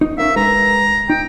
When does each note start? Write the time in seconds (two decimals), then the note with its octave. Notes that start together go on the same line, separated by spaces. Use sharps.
0.01 D#4
0.18 C#4 A#4 E5 F5
0.36 G#3 A#4 B4 A#5
1.10 D#4 G5